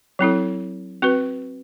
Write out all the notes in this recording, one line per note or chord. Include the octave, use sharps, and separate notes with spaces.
F#3 C4 E4 A4
C4 F#4 B4